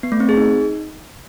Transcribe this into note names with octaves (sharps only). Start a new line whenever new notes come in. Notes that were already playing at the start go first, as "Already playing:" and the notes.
B3
A3
C4
G#4
D#4